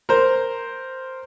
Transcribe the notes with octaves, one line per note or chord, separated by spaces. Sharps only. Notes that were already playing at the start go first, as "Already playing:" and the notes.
A#4 C5